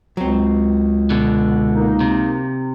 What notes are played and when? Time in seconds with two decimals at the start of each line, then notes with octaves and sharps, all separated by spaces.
0.17 C#2 F#3 C4
1.10 B2 D3
1.74 A#3 D#4
2.00 C3